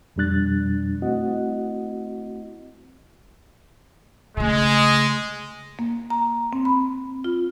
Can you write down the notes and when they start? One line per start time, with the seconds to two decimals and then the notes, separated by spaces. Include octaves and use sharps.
0.16 F2 B2 G3 D4 F#6 A6
1.02 A3 C4 E4 F#4 D#5 F#5
4.37 C#3 G#3 A3
5.79 A#3
6.10 A#5
6.53 C4
6.65 B5
7.24 F4